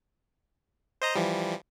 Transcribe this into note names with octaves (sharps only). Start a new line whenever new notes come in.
C5 D#5 A#5
E3 F3 G3